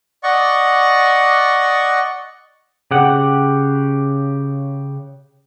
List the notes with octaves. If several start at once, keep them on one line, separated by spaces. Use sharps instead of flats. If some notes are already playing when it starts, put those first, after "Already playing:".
D5 D#5 F#5 C#6
C#3 G4 F#5